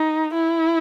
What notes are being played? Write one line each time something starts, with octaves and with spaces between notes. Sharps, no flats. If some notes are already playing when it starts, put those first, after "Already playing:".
Already playing: D#4
E4